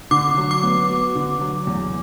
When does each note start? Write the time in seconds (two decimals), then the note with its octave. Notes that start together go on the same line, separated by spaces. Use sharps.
0.11 D3 D6
0.37 F#3
0.51 D6
0.63 B3
0.89 F#4
1.15 D3
1.41 F#3
1.67 E2